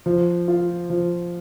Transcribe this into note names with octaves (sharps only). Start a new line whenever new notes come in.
F3
F4
F3